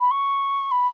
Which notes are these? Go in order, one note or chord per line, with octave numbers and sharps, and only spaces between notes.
B5
C#6
B5